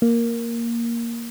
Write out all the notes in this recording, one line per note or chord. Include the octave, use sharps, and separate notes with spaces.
A#3